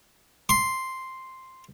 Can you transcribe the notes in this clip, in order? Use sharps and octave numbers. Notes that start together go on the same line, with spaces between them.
C6